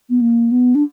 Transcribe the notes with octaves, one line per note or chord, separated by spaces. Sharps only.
B3
A#3
B3
D4